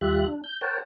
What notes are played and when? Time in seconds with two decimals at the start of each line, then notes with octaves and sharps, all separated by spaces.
0.01 D#2 G3 F4 G4 E5 F#6
0.27 D4
0.44 G6
0.61 A#4 C5 C#5 F#5 G5 A5